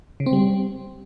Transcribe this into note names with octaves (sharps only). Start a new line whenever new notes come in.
C#3
C4
G3